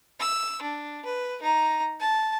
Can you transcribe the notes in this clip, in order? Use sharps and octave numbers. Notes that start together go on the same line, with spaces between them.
E6
D4
B4
D#4 A#5
A5